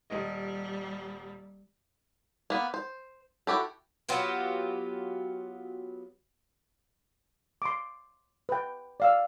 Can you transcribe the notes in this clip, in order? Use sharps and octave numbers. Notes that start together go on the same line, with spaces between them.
D#1 G3 D#5
A#3 B3
C5
E4 F#4 G4 A4
F#3 B3 F4 G4
C6 D6
B4 G5
D5 F5 E6